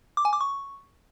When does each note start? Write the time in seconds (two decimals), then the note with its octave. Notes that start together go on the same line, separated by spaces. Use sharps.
0.17 D6
0.25 G#5
0.33 D6
0.41 C#6